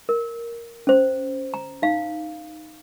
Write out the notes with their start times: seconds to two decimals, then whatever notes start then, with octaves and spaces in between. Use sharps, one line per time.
0.09 A#4
0.87 C#4 C5
1.54 A#5
1.82 D#4 F5